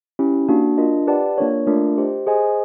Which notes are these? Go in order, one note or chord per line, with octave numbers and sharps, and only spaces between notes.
C#4 E4 G4
A#3 D4 F#4
D4 F4 A#4 D#5
G4 B4 D5 F#5 A5
A#3 D4 F4 A#4 C#5
A3 D4 F4 A#4 D5
G4 C5 D#5
G#4 C5 D#5 G#5